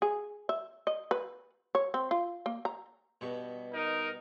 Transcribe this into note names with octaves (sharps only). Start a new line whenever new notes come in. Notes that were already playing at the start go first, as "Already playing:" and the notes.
G#4
E5
D#5
B4
C#5
C4
F4
A#3
A#5
G2 B2 C#6
D#4 A#4